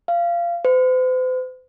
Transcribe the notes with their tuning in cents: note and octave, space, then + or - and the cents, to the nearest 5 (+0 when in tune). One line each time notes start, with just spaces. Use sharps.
F5 -20
C5 -45